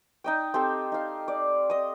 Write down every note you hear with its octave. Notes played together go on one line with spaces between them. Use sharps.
D#4 D#5 G5
C4 G4 A4
D#4 F5
D5
D#5 D#6